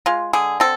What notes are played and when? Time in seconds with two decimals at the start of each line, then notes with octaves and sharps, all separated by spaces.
0.06 G#3 F4
0.33 D3 G#4
0.60 C4 A4